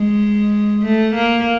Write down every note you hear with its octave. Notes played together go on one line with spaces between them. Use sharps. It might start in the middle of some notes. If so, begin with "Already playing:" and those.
Already playing: G#3
A3
A#3